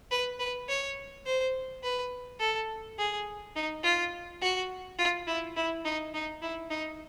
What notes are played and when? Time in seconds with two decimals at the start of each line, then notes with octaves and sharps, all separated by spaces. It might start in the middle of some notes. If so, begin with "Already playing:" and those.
0.11 B4
0.39 B4
0.69 C#5
1.26 C5
1.84 B4
2.40 A4
2.99 G#4
3.56 D#4
3.84 F4
4.42 F#4
4.99 F4
5.28 E4
5.56 E4
5.85 D#4
6.14 D#4
6.42 E4
6.70 D#4